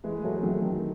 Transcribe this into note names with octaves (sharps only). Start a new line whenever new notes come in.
E3 G#3
F#3 A3
D#3 F#3
D#3